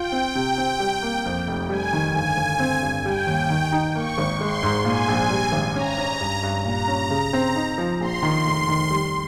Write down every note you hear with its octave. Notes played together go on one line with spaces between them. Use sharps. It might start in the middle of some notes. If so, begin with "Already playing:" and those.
Already playing: F4 G5
C4
C3
C4
G3
A#3
F2
F1
G3 G#5
D#3
G1 G#5
G1
C4
G2
G3 G5
D#2
D#3
D#4
A#3 C#6
G#1
G#3 C6
G#2
A#2 G#5
A#1
G3
G#1
C#4 A#5
C#4
G2
G2
A#2 A#5
C#4
C#3
C4
D#4
F3
A#1 C6
D#3
F1
D#3
G3